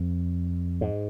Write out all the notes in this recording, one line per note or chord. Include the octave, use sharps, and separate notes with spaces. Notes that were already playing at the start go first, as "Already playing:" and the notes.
Already playing: F2
G#2